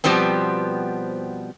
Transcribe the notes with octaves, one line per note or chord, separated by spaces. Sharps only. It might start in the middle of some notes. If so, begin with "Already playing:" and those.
B2 F3 G3 B3 C4